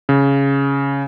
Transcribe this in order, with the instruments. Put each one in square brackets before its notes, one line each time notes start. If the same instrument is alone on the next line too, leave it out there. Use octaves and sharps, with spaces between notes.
[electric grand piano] C#3